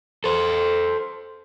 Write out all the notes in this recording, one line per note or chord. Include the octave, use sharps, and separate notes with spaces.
A4 C5